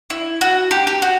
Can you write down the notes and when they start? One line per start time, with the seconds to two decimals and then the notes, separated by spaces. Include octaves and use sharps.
0.10 E4
0.41 F#4
0.71 G4
0.87 G4
1.02 F#4